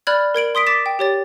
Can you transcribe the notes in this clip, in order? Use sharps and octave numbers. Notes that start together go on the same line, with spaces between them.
D5 B5 F6 F#6 G#6
A#4 G#6 D7 F#7
C6 D#6 B6 D7
D6 A6 B6 E7
G5
G4 C#5 A6